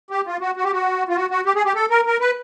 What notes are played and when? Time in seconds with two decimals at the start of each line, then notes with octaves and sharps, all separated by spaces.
0.11 G4
0.27 F4
0.41 F#4
0.57 F#4
0.64 G4
0.72 F#4
1.09 F4
1.16 F#4
1.30 F#4
1.46 G4
1.56 G#4
1.65 G4
1.75 A4
1.90 A#4
2.07 A#4
2.20 B4